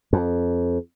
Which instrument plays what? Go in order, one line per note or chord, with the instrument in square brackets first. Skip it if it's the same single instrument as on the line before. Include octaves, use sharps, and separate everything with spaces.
[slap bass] F2